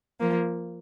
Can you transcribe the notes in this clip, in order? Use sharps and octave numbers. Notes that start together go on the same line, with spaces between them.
F3 A#3